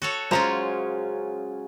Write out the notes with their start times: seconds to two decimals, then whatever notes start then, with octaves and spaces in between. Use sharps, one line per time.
0.02 F#4 A4 C#5
0.31 C#3 F#3 G#3 C#4 F4 C5 A#5